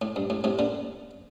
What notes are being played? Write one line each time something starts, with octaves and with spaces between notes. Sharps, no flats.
A2
G2
A2
A2 C3
A#2 D3